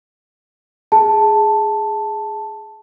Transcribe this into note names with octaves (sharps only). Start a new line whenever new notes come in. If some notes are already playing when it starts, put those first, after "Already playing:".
G#4 A5